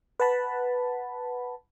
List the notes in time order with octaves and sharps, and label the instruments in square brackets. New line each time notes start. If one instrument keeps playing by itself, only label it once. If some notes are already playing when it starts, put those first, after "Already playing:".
[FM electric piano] B4 F#5 A5 B5